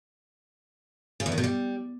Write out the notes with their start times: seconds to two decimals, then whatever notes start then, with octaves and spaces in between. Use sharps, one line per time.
1.20 C#3
1.26 E2
1.32 D#3
1.38 B2
1.44 G3